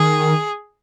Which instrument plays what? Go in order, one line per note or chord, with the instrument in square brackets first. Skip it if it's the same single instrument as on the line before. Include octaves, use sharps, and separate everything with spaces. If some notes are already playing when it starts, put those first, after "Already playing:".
Already playing: [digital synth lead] D#3 [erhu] G#4